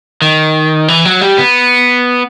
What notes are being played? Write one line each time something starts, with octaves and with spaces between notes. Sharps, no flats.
D#3
E3
F#3
G3
B3